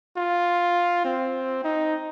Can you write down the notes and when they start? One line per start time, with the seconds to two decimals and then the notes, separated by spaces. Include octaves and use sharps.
0.17 F4
1.05 C4
1.64 D#4